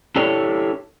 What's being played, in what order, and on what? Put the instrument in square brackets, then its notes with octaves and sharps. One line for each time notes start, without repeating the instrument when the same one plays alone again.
[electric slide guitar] D4 E4 G4 A4 C#5